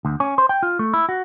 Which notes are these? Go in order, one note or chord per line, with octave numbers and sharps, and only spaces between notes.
D2
C#4
C5
G5
F4
A3
E4
F#4